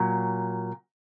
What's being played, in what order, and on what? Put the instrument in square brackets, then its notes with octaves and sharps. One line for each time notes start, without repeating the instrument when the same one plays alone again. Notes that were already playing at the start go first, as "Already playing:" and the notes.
Already playing: [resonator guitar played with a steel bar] A#2 F#3